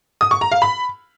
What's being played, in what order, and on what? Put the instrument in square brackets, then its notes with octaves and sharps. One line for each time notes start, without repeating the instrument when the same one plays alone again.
[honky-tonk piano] D#6
C#6
A#5
F5
B5